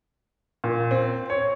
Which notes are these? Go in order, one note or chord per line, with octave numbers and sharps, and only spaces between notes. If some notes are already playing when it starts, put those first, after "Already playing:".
A#2
C4
C#5